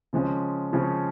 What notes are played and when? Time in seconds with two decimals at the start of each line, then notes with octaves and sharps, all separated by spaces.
0.13 C#3 F3 G#3 C#4
0.73 C#3 F3 G#3 C#4